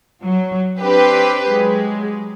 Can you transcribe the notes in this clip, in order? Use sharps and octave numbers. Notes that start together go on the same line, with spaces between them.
F#3
C4 D4 G4 B4
F#3 G#3